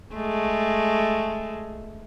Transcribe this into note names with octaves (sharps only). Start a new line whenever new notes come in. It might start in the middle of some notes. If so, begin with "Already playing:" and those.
G#3 A3